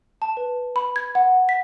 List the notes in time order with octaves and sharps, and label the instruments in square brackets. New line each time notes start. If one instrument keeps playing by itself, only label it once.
[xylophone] A5
B4
B5
G#6
F#5
B6